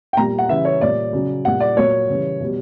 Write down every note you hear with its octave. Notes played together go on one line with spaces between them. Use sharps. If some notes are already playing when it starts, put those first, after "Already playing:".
G5
A#2 G3 A#5
F#5
C#3 E3 G3 E5
C#5
A#2 G3 D5
C#3 F#3
A#2 G3 F#5
D5
A#2 F#3 C#5
C#3 E3 G3
B2 G3